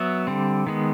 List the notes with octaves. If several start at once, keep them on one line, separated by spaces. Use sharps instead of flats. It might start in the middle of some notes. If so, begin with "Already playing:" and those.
Already playing: F#3 B3 E5
D3 G3 C4
D#3 G#3 B3